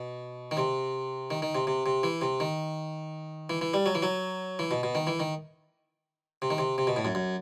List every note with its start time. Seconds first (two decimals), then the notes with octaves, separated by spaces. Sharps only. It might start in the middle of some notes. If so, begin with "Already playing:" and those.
Already playing: B2
0.51 D#3
0.57 C3
1.30 D#3
1.42 D#3
1.55 C3
1.67 C3
1.86 C3
2.03 E3
2.21 C3
2.40 D#3
3.50 E3
3.61 E3
3.74 G3
3.86 F#3
3.95 E3
4.02 F#3
4.59 E3
4.71 B2
4.83 B2
4.95 D#3
5.07 E3
5.20 D#3
6.42 C3
6.50 D#3
6.58 C3
6.78 C3
6.87 B2
6.96 A2
7.05 F#2
7.15 F#2